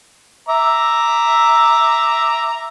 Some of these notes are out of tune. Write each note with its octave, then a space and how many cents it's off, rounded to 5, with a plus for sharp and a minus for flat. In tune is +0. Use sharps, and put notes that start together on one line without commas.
E5 +0 A#5 +0 D6 +0